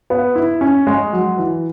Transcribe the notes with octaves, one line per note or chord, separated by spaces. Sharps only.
B3
E4
C#4
G#3
F#3
E3